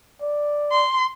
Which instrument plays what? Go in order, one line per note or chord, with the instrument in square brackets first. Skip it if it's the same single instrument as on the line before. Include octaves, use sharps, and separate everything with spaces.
[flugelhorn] D5
[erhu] C6